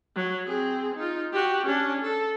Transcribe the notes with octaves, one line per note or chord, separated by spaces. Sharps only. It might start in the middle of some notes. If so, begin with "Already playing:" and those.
F#3
C4 G#4
D#4 F4
F#4 G4
C#4 D4
A4